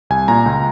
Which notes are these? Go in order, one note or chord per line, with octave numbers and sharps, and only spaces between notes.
C2 G#5
A#2 A#5
C#2